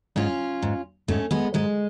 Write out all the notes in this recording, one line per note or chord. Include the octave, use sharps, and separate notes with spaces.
G#2 C#4 F4
G#2
G#2 A3 C#4
G#3 B3
G#2 G#3